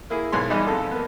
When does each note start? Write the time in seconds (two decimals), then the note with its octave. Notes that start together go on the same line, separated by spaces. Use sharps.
0.10 A#3 E4 G#4
0.32 B1 G#2 B4 G#5 C6
0.50 E3 G3 G#3 B3 D#4 E4
0.67 F2 A4
0.91 A#3 B3